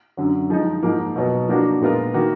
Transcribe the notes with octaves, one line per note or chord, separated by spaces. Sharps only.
F#2 D3 F#3
F3 G#3 D#4
G#2 F3 A#3
B2 F#3 B3
F3 A#3 D4 F#4
A#2 G#3 B3 F4 A#4
D#3 A#3 D#4 F#4